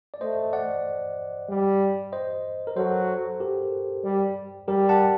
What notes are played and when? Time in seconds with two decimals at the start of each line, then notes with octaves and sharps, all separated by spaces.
0.14 D5
0.21 A3 C5 D#5
0.53 D5 F#5
1.49 G3
2.12 C5 D#5
2.67 A#4
2.76 F#3 A4 C5
3.40 G4 A#4
4.04 G3
4.68 G3 G4 A#4
4.89 F#5 A5